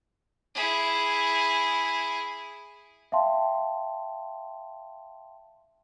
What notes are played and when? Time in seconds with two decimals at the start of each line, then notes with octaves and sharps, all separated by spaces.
0.55 E4 G#4
3.12 E5 F5 G5 A5 C6